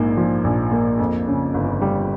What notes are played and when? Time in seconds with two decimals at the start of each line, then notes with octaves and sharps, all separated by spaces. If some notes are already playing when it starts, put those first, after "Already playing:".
Already playing: A#1 G#2 A#3
0.17 F3
0.44 A#1
0.72 A#3
0.99 F2
1.27 C#3
1.54 G1
1.81 G3